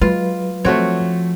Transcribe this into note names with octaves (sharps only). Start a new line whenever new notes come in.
F#3 G#3 F4 B4
F3 A3 C4 F#4 C#5